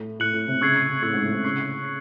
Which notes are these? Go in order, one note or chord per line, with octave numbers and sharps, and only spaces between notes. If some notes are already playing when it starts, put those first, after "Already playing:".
Already playing: A2
A2 F#6 C#7 F#7
A2
C3
C#3 C#6 E6 G#6 C7
C3
A2 C#6 E6 G#6 C7
G#2
A2
C3
C#3 C#6 E6 G#6 C7
C7